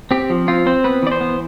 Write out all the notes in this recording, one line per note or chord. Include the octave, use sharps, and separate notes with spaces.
C4 G4
F3
C4 F4
C4 C5
B3 B4
E3 D5
C5
B3